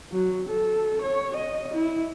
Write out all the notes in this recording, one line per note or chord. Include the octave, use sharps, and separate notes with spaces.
F#3
A4
C#5
D#5
E4